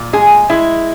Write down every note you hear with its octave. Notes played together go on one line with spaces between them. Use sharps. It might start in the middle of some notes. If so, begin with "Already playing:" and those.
Already playing: A#2
G#3 G#4
G#3 E4